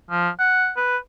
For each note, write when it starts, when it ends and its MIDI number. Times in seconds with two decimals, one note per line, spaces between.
0.11 0.29 53
0.40 0.71 78
0.77 0.98 71